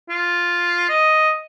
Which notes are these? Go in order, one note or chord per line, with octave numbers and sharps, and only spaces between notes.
F4
D#5